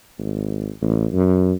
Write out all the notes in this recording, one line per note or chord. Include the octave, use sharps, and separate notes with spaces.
G#1
A1
F#2